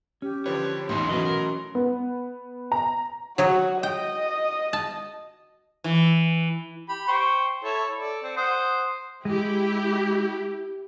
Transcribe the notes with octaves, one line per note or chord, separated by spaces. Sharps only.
C#4 G4
D3 F3 B4 C#5
B1 E2 A2 C#4 D#4 E4 C6
B2 E3 F#3 A3 C#4 F#4 B4 D#5
A#4
B3
A#5
F#3 F#4 C#5 D#5
D#5 G5
A5
E3
G4 B5
C5 G5 C#6
E4 A4 C#5
A4 D5
C4
C5 F#5 D#6
G#3 E4 G4